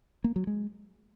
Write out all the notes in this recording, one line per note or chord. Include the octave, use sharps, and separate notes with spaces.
A#3
F#3
G#3